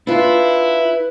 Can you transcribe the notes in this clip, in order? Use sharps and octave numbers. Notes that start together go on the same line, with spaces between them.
D4 E4 F4 B4